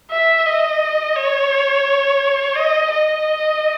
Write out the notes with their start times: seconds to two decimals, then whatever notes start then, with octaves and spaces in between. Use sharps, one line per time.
0.11 E5
0.46 D#5
1.16 C#5
2.55 D#5
2.91 D#5